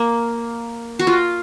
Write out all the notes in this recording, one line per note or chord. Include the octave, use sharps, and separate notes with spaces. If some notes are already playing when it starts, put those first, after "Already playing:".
Already playing: A#3
F#4
F4